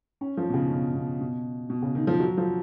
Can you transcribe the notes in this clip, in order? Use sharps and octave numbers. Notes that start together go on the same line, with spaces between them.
C#4
F3
B2
C#3
B2
B2
B2
B2
C#3
D#3
F3
F#3
F3